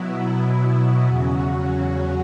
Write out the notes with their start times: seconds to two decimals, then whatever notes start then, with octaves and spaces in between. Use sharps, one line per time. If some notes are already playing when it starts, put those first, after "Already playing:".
Already playing: B2 F#3 B3 E4
1.06 E2 C#3 F#3 C#4 F#4